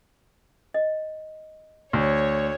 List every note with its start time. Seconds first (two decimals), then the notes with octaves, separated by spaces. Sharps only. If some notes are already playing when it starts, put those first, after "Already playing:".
0.74 D#5
1.93 D2 C#5